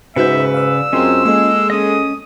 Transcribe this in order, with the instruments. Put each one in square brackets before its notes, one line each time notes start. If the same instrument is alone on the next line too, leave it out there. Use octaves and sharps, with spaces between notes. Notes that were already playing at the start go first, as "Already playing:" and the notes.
[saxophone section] G#2 B4 [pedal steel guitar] C#3 G6 [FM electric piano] D#4 F#4 C5 [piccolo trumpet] E5
[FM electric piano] D5 F5 [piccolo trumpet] E6
[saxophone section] F#2 G#3 C4 [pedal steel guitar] C#4 F4 [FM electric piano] C6
[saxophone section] G#3 [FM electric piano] A#3 A4
[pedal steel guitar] C#4 D#5 [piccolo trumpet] D#6